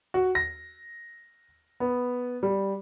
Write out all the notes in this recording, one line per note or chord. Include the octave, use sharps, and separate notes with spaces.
F#4
A#6
B3
G3